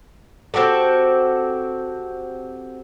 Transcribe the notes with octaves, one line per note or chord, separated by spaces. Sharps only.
C4 F#4 G4 A4